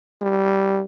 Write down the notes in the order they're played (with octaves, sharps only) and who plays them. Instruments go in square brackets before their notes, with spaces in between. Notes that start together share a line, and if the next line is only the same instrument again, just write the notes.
[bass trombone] G3